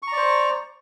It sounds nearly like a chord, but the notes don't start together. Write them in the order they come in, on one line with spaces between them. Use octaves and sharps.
C#6 A#5 D5 C5